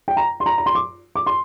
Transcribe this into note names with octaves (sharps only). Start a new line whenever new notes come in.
G5
A#5
C6
A#5
A#5
C6
D6
D6
C6